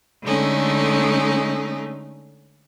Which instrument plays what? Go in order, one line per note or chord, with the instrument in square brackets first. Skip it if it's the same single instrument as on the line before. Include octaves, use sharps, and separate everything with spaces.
[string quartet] D3 G#3 A3 C#4 D#4